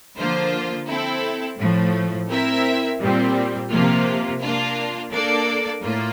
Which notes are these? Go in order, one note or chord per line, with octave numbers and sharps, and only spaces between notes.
D3 F3 A#3 F4 C5
C4 E4 A4
A2 F3 A3
C4 E4 A#4 E5
A#2 G3 C4
C3 F3 A#3 F4
A#3 D4 F4
A#3 D4 A4 D5
A2 A#3 F4